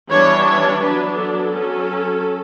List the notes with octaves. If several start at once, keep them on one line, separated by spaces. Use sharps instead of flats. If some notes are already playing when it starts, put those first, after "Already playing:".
E3 G3 B3 D4 C#5
C#5
F#3 B3 D4 B4
A4
F#3 C#4